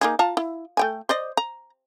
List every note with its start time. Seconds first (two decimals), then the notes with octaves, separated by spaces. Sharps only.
0.01 A#3 D#4 G#4
0.19 F4 A5 A#5
0.37 E4
0.77 A3 G5 G#5
1.09 C5 D5 D#5
1.37 A#5